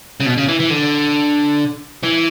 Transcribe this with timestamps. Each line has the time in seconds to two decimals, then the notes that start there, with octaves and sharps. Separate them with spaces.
0.20 C#3
0.26 B2
0.37 C#3
0.48 E3
0.60 E3
0.70 D3
2.03 E3